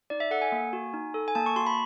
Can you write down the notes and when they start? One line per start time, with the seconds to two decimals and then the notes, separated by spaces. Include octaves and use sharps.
0.10 D#4 D5
0.20 E5
0.31 A4 F#5
0.42 G#5
0.52 A#3
0.73 F#4
0.94 D#4
1.14 A4
1.28 G#5
1.35 A#3 A5
1.46 C#6
1.56 F#4 C6
1.66 B5